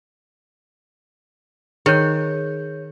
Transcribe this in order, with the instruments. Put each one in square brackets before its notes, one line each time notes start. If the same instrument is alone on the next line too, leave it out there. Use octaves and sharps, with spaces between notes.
[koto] D#3 [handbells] G#4 C#5 G6